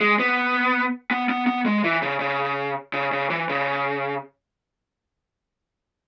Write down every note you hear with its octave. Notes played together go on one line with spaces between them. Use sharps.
G#3
B3
B3
B3
B3
G#3
E3
C#3
C#3
C#3
C#3
E3
C#3